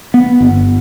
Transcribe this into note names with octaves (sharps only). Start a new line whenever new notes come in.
B3
G1